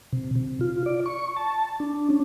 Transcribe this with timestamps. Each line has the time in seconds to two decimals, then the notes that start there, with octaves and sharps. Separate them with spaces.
0.13 C3
0.35 C3
0.61 F4
0.86 D5
1.06 C#6
1.36 A5
1.80 D4
2.10 C#4